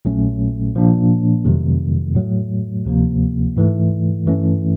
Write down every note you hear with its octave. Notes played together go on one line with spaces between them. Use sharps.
A#1 A#2 F#3 A3 C#4
A#2 F3 A#3 D4
F2 C3 D#3 F#3 A3
A2 F#3 A3
D2 C3 F3 A#3
G#2 E3 A3
G2 E3 A3 C#4